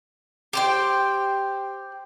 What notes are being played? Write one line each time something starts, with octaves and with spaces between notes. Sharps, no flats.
G4 C5 G5